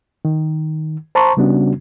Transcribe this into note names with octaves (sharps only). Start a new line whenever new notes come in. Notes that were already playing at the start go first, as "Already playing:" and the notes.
D#3
C5 A5 A#5 C6 C#6
C#3 G3 B3 C#4 D4 F#4